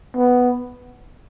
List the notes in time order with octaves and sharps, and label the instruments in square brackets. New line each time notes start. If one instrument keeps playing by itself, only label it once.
[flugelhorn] B3